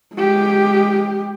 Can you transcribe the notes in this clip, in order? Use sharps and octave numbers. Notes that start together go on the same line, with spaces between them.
G#3 G4